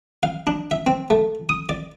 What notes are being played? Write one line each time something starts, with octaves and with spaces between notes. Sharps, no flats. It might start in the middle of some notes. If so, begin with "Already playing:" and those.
F5
D4
E5
C4
A3
D#6
D5